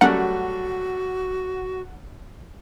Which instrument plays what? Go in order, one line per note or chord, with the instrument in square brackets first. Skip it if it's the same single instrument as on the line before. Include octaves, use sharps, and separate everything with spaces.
[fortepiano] F#3 G3 A3 [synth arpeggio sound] C#4 A#4 [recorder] F#4 [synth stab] F#5